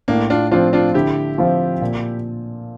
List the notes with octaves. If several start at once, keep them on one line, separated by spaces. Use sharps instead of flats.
A2 A#3 D4
D4 F4
F3 C4 D4 F4
D4 F4
D3 E4 G4
F3 C4 F4
A#2